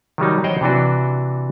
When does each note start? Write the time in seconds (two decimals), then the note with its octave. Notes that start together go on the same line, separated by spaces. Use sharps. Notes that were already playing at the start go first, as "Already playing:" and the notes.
0.18 D#3 F#3 G3 D#4
0.44 C5 C#5 D#5 F#5 G5
0.61 C3 E3 D4 F#4